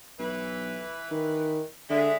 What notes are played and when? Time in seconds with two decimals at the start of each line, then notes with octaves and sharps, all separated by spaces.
0.19 B1 E3 B4
1.11 D#3
1.90 D3 G#3 D4 E5